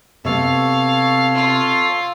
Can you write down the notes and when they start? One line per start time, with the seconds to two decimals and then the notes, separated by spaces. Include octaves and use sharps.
0.25 C3 B3 A4 C#5 F5
1.35 F4 F5